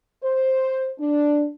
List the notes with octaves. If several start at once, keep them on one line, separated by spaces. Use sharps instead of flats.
C5
D4